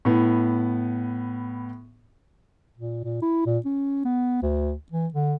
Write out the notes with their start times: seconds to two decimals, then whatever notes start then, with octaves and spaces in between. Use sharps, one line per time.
0.05 A2 B3
2.77 A#2
3.04 A#2
3.22 E4
3.46 A#2
3.65 C#4
4.05 B3
4.42 D2
4.92 E3
5.14 D3